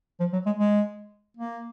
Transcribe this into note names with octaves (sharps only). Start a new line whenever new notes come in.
F3
F#3
G#3
G#3
A#3